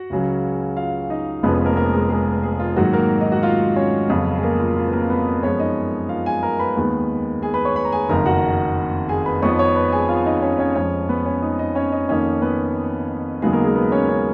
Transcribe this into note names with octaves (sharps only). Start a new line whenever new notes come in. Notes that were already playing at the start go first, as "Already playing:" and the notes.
Already playing: F#4 F#5
C#2 C#3 F#3 C#4
F4 F5
D#4 D#5
F1 F2 F3 G#3 B3 C#4 B4
B3 B4
A#3 A#4
A#3 A#4
G#3 G#4
G#3 G#4
G#3 G#4
F4
G#2 D#3 F#3 A#3 F#4
A#3 A#4
D#4 D#5
F#4 F#5
F4 F5
C#4 C#5
F2 C#3 F#3 B3
G#4
A#3 A#4
F4
F4
B4
A#3 A#4
B3 B4
F#2 F3 G#3 B3 C#4 C#5
D#4 D#5
F4 F5
G#4 G#5
A#4 A#5
B4 B5
D#2 D#3 G#3 B3
G#4 G#5
B4 B5
C#5 C#6
B4 B5
A#5
G#4 G#5
F#1 F2 D#3 A#4 A#5
F#4 F#5
G#4 G#5
B4 B5
F2 F3 B3 D#4 C#5 C#6
C#5 C#6
B4 B5
G#4 G#5
F4 F5
D#4 D#5
C#4 C#5
C#4 C#5
F2 F3 G#3 C#4 C#5
B3 B4
C#4 C#5
D#4 D#5
D#4 D#5
C#4 C#5
D#4 D#5
F2 D#3 A#3 C#4 D#4 C#5
B3 B4
D#2 C#3 F#3 G#3 B3 D#4 G#4
A#3 A#4
G#3 G#4
B3 B4
C#4 C#5
C#4 C#5